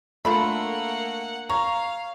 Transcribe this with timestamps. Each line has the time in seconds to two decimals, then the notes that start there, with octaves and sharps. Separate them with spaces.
0.25 A3 A#3 D4 F4 F#5 B5
1.49 C#5 F5 A#5